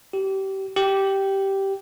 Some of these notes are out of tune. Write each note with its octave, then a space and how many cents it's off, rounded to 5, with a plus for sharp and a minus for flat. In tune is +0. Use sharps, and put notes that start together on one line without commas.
G4 -25
G4 -10